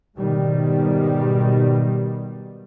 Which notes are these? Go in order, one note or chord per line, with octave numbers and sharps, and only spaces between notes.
G#2 B2 D#3 G3